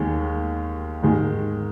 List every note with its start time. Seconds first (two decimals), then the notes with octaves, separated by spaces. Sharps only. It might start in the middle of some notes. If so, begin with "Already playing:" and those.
Already playing: D#2 D#3 G#3
1.02 G#2 D#3 G#3